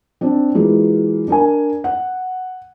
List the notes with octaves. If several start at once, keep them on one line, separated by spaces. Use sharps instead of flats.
C4 D4
E3 F#3 G#3 A#3 F4
D4 A#4 G#5
F#5